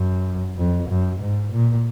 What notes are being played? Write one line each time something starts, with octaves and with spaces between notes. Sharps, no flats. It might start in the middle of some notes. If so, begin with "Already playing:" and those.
Already playing: F#2
F2
F#2
G#2
A#2